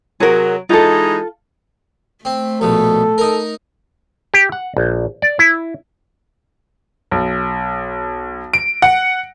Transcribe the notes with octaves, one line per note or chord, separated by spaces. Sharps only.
C3 F#3 G#4 A#4
E3 G#3 D#4 F4 A4
A3 C4
A#1 B2 A4
D#4 A#4
G4
F#5
A#1
D5
E4
B1
D7
F#5